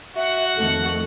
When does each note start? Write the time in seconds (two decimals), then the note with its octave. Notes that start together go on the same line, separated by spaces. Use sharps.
0.16 F#4 E5 F#5
0.57 F2 D#3 A3 A4